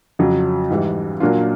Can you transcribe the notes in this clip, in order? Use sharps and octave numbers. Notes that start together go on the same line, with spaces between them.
F2 C#3 F#3
G#2 E3 G3
A#2 F#3 A#3 D4 F4